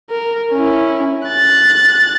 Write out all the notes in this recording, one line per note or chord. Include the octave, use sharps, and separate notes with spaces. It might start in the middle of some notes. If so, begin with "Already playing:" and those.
A#4
C#4 E4
F#6 A6